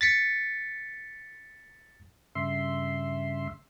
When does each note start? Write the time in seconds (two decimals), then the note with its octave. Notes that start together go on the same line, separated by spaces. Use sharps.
0.01 A6 B6 C#7
2.35 G2 C#3 E5 C6